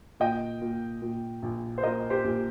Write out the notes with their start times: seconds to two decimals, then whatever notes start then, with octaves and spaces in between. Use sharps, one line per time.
0.20 A#2 D#5 G5
0.61 A#2
1.02 A#2
1.42 A#1
1.78 C5
1.82 A#2 A#4 D#5
2.10 G4 C5
2.24 A#1